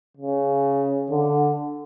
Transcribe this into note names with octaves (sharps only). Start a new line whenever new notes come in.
C#3
D3